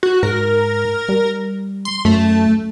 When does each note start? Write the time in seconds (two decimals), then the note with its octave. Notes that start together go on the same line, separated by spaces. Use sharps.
0.03 F#4
0.23 G#2 A#4
1.09 G3
1.85 C6
2.05 F#2 A3